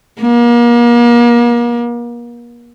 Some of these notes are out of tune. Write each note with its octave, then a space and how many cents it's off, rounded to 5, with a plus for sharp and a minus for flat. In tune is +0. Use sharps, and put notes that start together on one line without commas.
A#3 +35